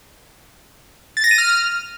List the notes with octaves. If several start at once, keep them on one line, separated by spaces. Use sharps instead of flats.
A6
A#6
D#7
F6